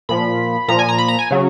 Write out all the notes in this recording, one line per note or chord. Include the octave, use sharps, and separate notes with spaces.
A#2 F3 B5
A#2 F3 A#5
G#5
A#5
B5
A#5
G#5
C#3 F#3